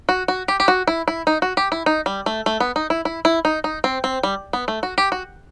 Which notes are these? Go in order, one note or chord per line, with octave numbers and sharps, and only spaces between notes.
F#4
F#4
G4
G4
F#4
E4
E4
D#4
F#4
G4
E4
D#4
G3
A3
A3
B3
D#4
E4
E4
E4
D#4
D#4
C4
C4
G3
B3
A3
F#4
G4
F#4